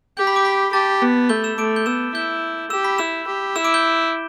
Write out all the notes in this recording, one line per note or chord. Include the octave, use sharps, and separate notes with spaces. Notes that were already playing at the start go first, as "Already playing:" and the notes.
G4 G6
B5 B6
D6 D7
B5 B6
G4 A5 A6
B3
A3 G6 G7
E6 E7
A3 D6 D7
G6 G7
B3 E6 E7
E4 G6 G7
G4 E6 E7
B5 B6
E4 E6 E7
G4
E4 E6 E7
D6 D7
G6 G7